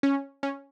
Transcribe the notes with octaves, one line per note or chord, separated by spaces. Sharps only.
C#4
C#4